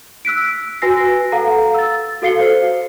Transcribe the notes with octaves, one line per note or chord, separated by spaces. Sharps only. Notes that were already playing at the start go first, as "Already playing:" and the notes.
E6 F#6 B6 D7
F#4 B4 G#5 E6 A#6 C7
A4 F5 F#5 A#5
E6 A6
F#4 A4 F5 C7 C#7 G7
C5